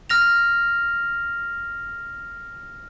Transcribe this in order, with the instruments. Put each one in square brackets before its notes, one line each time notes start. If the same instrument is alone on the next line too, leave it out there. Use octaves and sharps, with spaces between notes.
[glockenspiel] F6 A#6 F7